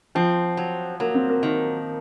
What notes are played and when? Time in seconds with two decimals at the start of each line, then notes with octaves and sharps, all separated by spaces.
0.15 F3 C4
0.57 F#3
1.00 F#3 A#3
1.15 C4
1.29 A#3
1.43 D#3